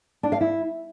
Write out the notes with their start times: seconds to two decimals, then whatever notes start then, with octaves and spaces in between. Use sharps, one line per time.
0.23 D4
0.32 F5
0.41 E4